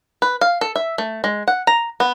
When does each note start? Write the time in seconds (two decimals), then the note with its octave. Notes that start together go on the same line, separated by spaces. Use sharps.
0.22 B4
0.41 F5
0.61 A4
0.76 E5
0.98 A3
1.24 G#3
1.48 F#5
1.67 A#5
2.00 B3